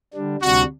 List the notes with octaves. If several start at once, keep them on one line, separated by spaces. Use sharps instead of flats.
D3 G3 D4
D2 C3 G3 D4 F#4